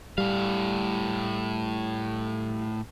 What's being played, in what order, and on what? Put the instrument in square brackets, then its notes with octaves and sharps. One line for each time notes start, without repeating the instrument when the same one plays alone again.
[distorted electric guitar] A2 F5 [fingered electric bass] G3